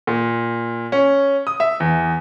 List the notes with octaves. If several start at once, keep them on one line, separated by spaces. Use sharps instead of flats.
A#2
C#4
D#6
E5
E2